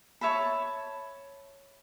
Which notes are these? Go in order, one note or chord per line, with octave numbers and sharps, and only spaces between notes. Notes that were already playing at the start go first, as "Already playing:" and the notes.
C#5 E5 A5 B5